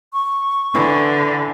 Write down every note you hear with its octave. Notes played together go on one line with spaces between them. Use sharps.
C#6
D3 E3